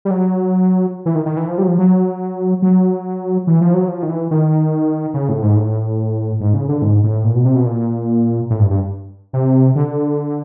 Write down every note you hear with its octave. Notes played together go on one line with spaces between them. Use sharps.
G3
F#3
E3
D#3
D#3
E3
F3
G3
F#3
F3
F#3
F#3
E3
F3
F#3
F3
D#3
E3
D#3
C#3
A2
G#2
A2
G#2
C#3
D3
G#2
A2
A#2
B2
C3
B2
A#2
A2
G2
G2
C3
D3